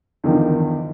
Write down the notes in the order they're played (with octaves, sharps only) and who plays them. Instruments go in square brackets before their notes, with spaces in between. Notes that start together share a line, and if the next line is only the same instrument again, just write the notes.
[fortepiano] E2 G2 D3 D#3 F3